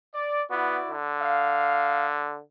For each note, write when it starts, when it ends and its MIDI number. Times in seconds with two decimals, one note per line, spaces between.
0.15 0.44 74
0.51 0.78 59
0.51 0.93 64
0.51 0.93 66
0.51 0.93 74
0.90 2.40 50
1.21 2.07 77